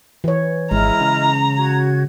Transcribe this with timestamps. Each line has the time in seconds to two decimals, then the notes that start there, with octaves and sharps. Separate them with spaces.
0.24 E3 C#5
0.71 G#1 G#3 E4 D#5 A#5 F6
1.01 C#3
1.58 F#4 G#6